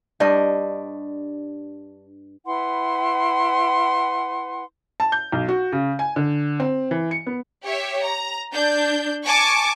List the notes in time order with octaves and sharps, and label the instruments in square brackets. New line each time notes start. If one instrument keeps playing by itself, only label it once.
[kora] G2 G3 D4 D#5
[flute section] E4 B4 F#5 C6
[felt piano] A5
G6
B1
F#4
C#3
G#5
D3
C4
E3
C#7
B3
[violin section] G4 C#5 E5
A#5
D4 G6
G#5 A5 C#6 D6